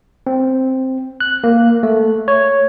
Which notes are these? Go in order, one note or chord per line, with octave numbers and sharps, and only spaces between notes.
C4
F#6
A#3
A3
C#5